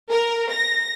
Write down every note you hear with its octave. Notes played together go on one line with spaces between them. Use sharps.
A#4
A#6